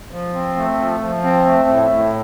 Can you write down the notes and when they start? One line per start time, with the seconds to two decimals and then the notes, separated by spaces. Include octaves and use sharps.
0.11 F3
0.34 C4
0.56 A3
0.78 F3
1.01 F3
1.23 C4
1.45 A3
1.69 A2
1.91 A2